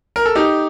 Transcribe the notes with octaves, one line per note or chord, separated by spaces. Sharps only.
A#4
A4
D#4 G4